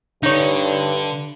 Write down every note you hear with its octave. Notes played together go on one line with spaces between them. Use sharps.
G2 D3 D#4 C#5